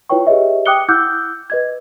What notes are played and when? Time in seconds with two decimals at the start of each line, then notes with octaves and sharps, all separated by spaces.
0.10 E4 F4 B4 C#5 G5 C#6
0.27 G4 G#4 B4 C#5 D#5 E5
0.66 G5 D6 D#6 F#6 C#7 G7
0.89 E4 F#5 D6 E6 F#6 G6
1.50 B4 D#5 G#6